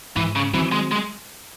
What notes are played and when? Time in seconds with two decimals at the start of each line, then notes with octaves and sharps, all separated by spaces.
0.17 G#2 E3
0.36 C#3
0.54 D#3 E3 F#3 C4
0.72 G#3
0.92 G#3